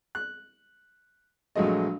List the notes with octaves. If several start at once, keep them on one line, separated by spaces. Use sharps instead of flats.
F#6
A#1 F#3 G#3 A3 D#5